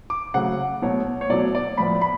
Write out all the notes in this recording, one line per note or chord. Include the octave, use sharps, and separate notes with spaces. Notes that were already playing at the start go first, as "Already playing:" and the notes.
D6
C#3 F#3 A3 F#5
B2 F#3 A3 C#5
C#5
B2 F#3 A3 D5
D5
A2 F3 B3 B5
B5